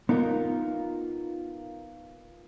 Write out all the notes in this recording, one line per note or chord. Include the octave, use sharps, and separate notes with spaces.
B3 D#4 F4 A#4